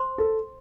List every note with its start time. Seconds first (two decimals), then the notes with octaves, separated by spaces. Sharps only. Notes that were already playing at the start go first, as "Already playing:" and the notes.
Already playing: C5 C6
0.18 A4